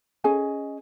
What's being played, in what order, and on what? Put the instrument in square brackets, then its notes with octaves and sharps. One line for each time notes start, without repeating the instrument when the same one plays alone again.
[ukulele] C#4 G#4 D#5 G#5